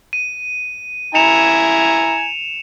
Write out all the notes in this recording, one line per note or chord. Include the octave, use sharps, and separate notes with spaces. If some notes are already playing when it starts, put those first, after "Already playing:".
D#7
E4 G#5 A#5 C#7 E7 F7